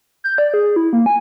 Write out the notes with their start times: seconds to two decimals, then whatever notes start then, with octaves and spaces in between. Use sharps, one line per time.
0.24 G6
0.38 D5
0.54 G#4
0.76 E4
0.93 A#3
1.06 G#5